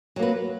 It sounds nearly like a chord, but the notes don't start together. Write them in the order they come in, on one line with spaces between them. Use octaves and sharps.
F#3 A#3 B4